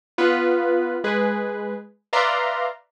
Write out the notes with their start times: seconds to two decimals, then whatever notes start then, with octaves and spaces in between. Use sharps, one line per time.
0.18 B3 F4 B4
1.04 G#3 G#4 B4
2.13 B4 D5 E5 F5 A#5 C6